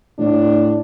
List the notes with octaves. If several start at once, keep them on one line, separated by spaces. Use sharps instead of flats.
A2 D4